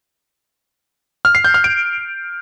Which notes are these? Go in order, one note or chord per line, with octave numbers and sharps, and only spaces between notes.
F6
C7
G6
F6
D7